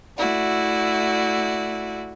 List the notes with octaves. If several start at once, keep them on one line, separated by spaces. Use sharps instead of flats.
A3 E4 F#4 D5